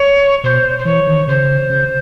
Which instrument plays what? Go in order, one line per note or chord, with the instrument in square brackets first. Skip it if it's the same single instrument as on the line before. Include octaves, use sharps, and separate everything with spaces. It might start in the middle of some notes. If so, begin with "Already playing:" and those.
Already playing: [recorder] C#5
[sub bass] B2 [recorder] C5
[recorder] C5
[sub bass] E3 [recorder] C#5
[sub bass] D#3
[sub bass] C#3 [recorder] C5
[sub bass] C#3